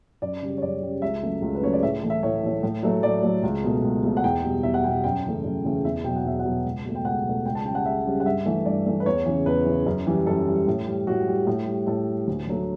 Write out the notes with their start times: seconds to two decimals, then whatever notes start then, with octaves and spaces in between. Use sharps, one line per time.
0.22 F#2 D5
0.42 C#3 G3
0.58 C#5
0.62 F#2 D5
0.82 C#3 G3
1.02 C#2 E5
1.23 C#3 F#3 A3
1.42 C#2
1.55 B4
1.62 C#3 F#3 A3 C#5
1.73 D5
1.82 A2 E5
2.03 E3 A3
2.10 E5
2.23 A2 C#5
2.43 E3 A3
2.63 A2
2.83 F#3 A3
3.03 A2 D5
3.23 F#3 A3
3.43 C#2
3.64 B2 A3
3.84 C#2
4.03 B2 A3
4.17 F#5
4.24 E2 G5
4.43 B2 G3
4.63 E2 E5
4.74 F#5
4.84 B2 G3 G5
5.04 F#2 G5
5.25 C#3 E3 A3
5.44 F#2
5.64 C#3 E3 A3
5.85 E2 E5
6.04 B2 F#3 G5
6.16 F#5
6.25 E2 E5
6.39 F#5
6.45 B2 F#3
6.65 C#2
6.85 B2 A3
6.95 G5
7.04 C#2 F#5
7.25 B2 A3
7.46 C#2 G5
7.55 A5
7.65 C#3 G5
7.69 G3
7.75 F#5
7.85 C#2 E5
8.06 C#3 G3
8.20 F#5
8.25 G2 E5
8.46 E3 A3
8.65 G2 D5
8.86 E3 A3
9.00 B4
9.06 E2 C#5
9.26 C#3 E3
9.46 E2 B4
9.66 C#3 E3
9.86 F#2
10.07 E3 G3
10.26 F#2 A4
10.46 E3 G3
10.67 A2
10.87 G3
11.07 A2 F#4
11.27 G3
11.47 A2
11.67 G3
11.87 A2 A4
12.07 G3
12.27 D2
12.47 D3 F#3 A3